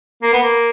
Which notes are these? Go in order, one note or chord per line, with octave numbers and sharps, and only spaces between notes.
A#3
B3
A#3